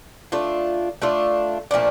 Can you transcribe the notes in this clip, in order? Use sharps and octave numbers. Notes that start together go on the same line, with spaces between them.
A3 D4 F4
A3 D4 F4
A#2 F3 A3 D4